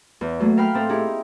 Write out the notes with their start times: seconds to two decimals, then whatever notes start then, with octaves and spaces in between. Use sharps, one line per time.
0.21 E2
0.40 F#3 A3 A#3
0.57 A#4 F5 G5 B5 F6
0.74 A2 C4 A4
0.89 D#4 E4 G4 G#4